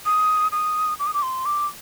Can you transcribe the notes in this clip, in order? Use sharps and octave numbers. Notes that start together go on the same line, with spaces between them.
D#6
D#6
D6
D#6
D6
C6
D6